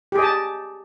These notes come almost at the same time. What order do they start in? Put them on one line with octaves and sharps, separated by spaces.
G4 G#4 D#5 A5